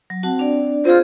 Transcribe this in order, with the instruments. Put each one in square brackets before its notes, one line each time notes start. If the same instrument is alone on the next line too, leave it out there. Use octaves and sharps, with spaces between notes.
[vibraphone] F#3
[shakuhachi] C4 [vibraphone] F#4 F#5 A5
[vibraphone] D4 D5
[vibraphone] C4 G#4 [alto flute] F4 [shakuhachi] C5